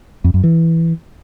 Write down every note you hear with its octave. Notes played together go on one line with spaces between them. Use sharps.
F2
F#2
E3